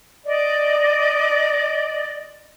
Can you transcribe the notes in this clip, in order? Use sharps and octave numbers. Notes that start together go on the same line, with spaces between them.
D5 D#5